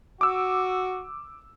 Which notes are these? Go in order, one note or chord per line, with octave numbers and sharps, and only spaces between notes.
F#4 D6 E6